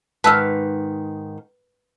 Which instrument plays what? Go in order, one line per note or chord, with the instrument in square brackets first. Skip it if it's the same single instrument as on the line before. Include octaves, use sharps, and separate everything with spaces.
[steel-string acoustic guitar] G#2 D#3 [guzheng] B4 [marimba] A5 E6 F6